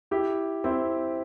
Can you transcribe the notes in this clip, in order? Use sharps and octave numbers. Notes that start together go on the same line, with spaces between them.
E4 G4
C4 E4